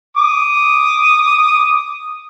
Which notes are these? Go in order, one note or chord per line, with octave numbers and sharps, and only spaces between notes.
D6 D#6